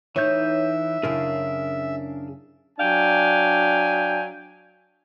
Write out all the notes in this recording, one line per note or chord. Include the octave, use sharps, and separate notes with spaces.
E3 D#4 C#5 E5 G6
F#2 C#3 D4 E4 G#4 A#4
F#3 D4 F5 G5 G#5